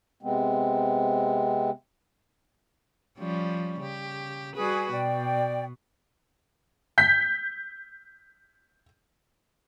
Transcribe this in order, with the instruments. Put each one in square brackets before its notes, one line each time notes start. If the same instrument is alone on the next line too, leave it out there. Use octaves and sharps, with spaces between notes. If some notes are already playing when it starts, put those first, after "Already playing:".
[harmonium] C3 G#3 B3 C4
[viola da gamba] F3 G3 C#4
C#3 G4
[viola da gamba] G3 F#4 B4 [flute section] G#4
[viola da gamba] B2 [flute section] D5 G5
[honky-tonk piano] G6 B6